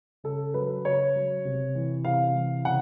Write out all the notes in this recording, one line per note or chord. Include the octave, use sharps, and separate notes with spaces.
C#3 A4
F#3 B4
C#3 C#5
F#3
C3
E3
C3 F5
E3
C#3 F#5